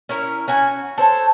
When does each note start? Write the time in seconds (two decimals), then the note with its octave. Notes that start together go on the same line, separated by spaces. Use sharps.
0.09 C#4 E4 A#4
0.48 C#4 F#4 G#5
0.98 A4 C5 C#5